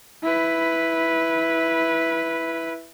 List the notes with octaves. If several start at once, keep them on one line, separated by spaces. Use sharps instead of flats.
E4 B4